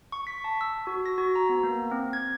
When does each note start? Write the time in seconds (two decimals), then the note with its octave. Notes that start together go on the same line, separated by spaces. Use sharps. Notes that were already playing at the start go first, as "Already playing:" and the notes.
0.12 C#6
0.27 B6
0.44 A5
0.61 E6
0.87 F#4
1.06 A#6
1.18 F#4
1.35 A#5
1.49 B3
1.63 A#3
1.91 C4
2.13 G#6